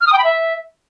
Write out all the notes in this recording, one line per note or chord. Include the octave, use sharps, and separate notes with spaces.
F6
D#6
G5
B5
E5